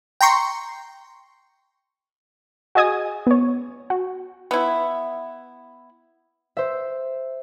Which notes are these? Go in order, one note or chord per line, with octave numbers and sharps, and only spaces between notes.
G5 A#5 C6 C#6
F#4 G#4 D#5 G#5 D#6
B3 C#5
F#4
B3 E4
C5 E5